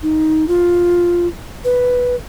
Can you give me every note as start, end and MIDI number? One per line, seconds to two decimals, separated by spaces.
0.03 0.45 63
0.48 1.27 65
1.65 2.15 71